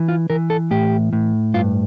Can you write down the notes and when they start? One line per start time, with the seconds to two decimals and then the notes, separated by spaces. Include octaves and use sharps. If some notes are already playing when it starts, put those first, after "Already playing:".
Already playing: E3
0.08 F4
0.30 E3 A#4
0.50 A4
0.71 A2 G4
1.13 A2
1.54 G2 F4